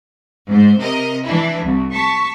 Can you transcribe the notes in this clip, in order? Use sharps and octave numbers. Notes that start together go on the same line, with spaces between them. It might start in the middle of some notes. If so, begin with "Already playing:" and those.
G#2 C5
C3 A#4 D#5
E3 D4 E4
C2
A5 C#6 B6